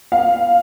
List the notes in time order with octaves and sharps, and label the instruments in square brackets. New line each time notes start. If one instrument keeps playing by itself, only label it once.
[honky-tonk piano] F5